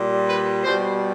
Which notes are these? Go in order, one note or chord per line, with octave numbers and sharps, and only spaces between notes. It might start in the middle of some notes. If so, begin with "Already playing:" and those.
Already playing: A#2 G3
B4
B2 G3 C5